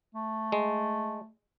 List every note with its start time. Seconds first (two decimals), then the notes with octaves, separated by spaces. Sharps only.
0.15 A3
0.52 G#3